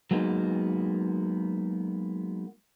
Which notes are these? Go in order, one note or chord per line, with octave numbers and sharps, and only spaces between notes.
F#3 G#3 A#3 B3 D#4